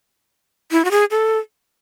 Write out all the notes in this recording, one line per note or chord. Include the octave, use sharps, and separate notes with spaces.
E4
F#4
G#4
A4